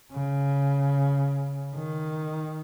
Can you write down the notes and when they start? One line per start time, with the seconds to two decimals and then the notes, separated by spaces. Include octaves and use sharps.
0.12 C#3
1.76 D#3